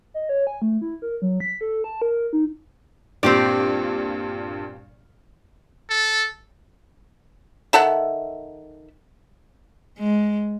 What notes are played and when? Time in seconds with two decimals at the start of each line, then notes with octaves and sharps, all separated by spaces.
0.14 D#5
0.29 C#5
0.47 G#5
0.62 A3
0.81 E4
1.02 A#4
1.22 F#3
1.40 B6
1.61 A4
1.84 A5
2.02 A#4
2.33 D#4
3.23 G2 A#2 C4 G4 D5
5.90 A4
7.73 D#3 A4 E5 F#5
9.98 G#3